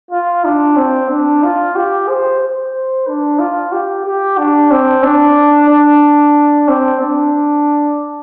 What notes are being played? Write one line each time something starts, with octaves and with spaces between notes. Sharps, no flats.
F4
D4
C4
D4
F4
G4
C5
C5
D4
F4
G4
G4
D4
C4
D4
D4
C4
D4